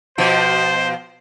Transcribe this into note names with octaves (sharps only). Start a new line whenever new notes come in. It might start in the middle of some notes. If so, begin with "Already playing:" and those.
B2 F3 C5